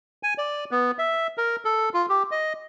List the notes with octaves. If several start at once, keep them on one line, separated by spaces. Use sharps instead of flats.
G#5
D5
B3
E5
A#4
A4
F4
G4
D#5